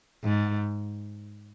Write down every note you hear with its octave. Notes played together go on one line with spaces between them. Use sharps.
G#2